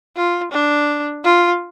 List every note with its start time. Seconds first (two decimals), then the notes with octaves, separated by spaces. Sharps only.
0.16 F4
0.52 D4
1.24 F4